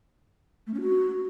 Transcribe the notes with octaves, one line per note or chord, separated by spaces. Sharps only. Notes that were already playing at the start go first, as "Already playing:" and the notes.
A3
C#4
F#4